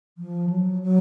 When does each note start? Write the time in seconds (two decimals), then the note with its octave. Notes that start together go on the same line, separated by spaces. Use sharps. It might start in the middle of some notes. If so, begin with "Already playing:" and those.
0.18 F3
0.49 F#3
0.82 F#3